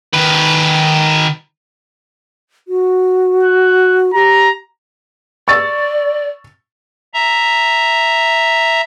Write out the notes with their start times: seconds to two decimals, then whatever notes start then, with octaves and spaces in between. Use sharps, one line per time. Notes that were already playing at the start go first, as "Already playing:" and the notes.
0.13 D#3 B4
2.68 F#4
3.43 F#6
4.14 G4 A#5
5.48 D5 C#6 E6 A6
7.14 E5 A#5